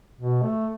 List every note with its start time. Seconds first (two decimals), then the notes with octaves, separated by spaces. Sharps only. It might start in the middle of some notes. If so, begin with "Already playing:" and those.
0.20 B2
0.43 A3